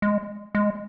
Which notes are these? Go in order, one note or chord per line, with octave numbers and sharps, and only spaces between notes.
G#3
G#3